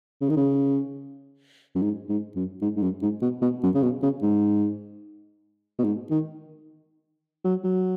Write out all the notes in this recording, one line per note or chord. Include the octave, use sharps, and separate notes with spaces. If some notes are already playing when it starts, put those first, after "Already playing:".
C#3
D#3
C#3
F#2
G#2
G#2
F#2
G#2
G#2
F#2
G#2
B2
B2
F#2
C#3
B2
C#3
G#2
B2
G#2
D#3
F#3
F#3